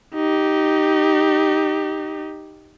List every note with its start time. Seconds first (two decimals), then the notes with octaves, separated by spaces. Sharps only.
0.15 D#4 G4